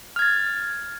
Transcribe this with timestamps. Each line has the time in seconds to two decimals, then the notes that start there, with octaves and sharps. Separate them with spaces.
0.16 F6
0.19 G#6
0.22 A6